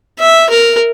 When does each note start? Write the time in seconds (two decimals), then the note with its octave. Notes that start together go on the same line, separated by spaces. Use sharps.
0.19 E5
0.50 A#4